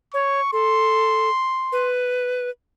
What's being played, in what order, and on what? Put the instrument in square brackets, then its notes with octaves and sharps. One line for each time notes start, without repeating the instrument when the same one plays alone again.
[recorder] C#5 [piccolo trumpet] C#6
[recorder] A4 [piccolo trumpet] C6
[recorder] B4